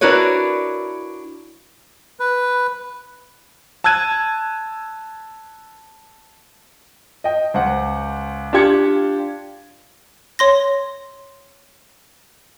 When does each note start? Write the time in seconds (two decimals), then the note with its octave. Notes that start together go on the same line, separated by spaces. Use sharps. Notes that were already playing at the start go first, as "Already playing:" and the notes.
0.01 D4 E4 F#4 A#4 B4 C#5
2.20 B4
3.84 A5 E6 F#6 G#6 D#7
7.24 D#5 G5
7.54 C#2 C5 F#5
8.53 D4 F4 G4 G#6 C#7
10.39 C#5 C6 A#6